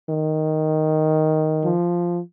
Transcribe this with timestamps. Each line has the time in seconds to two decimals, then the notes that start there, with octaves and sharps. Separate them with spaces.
0.10 D#3
1.65 F3